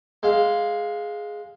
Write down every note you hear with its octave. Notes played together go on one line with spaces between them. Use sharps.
G#3 F5